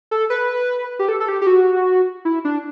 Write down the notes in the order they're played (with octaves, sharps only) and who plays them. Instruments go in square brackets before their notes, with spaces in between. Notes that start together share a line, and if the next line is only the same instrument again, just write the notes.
[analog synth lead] A4
B4
G4
A4
A4
G4
G4
F#4
E4
D4